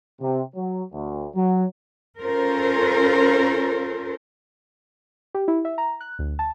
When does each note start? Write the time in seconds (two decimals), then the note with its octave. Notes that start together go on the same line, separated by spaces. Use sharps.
0.21 C3
0.56 F#3
0.93 D2
1.35 F#3
2.20 C#4 F4 A4 A#4 C5
5.35 G4
5.48 E4
5.65 E5
5.78 A#5
6.01 F#6
6.19 D2
6.39 A5